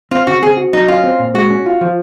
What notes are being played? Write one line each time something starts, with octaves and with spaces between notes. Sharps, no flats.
C4 F4
C#3 F#4
C4 G#4
F#4
F#3 D#4
C#4 F4
C4
A#2
G#3 F#4
C#4
F4
F3